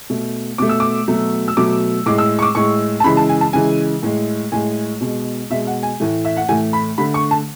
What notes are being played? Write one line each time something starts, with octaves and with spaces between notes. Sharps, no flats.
B2 A3
B2 A3 D6
E6
D6
B2 F#3 A3
E6
B2 F#3 A3 D6
A2 G#3 D6
E6
C#6
D6
A2 G#3 C#6
A5
C#3 E3 G#3 B5
A5
G#5
A5
C#3 E3 G#3 G#5
A2 G#3
A2 G#3 G#5
B2 G#3
B2 G#3 E5
F#5
G#5
A2 E3 A3
E5
F#5
A2 E3 A3 G#5
B5
D3 A3 B5
C#6
A5